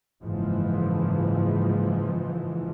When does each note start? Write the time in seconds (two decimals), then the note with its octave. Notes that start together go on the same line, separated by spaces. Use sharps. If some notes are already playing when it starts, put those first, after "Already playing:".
0.23 F#1 G#2 E3 F3